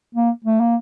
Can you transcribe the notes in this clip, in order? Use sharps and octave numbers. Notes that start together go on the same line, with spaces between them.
A#3
A3
A#3